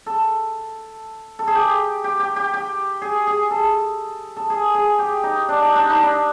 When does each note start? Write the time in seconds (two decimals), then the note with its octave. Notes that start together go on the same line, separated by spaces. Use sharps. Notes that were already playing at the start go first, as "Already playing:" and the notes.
0.06 A4
1.39 A4
1.47 G#4
1.55 G4
2.04 G4
2.20 G4
2.36 G4
2.54 G4
3.02 G#4
3.27 G#4
3.51 A4
4.37 A4
4.50 G#4
4.75 G#4
4.99 G4
5.24 D#4
5.49 D4
5.62 D#4
5.76 D4
5.90 D#4
6.03 D4